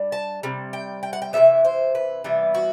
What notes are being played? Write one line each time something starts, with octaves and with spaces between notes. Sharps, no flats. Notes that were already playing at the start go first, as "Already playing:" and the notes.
Already playing: G3 D4
A5
C3 G3
G5
G5
F#5
G5
C3 E3 G3 B3 E5
C5
B4
C3 E3 G3 B3
F#4